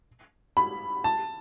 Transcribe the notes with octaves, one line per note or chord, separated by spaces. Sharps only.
B5
A5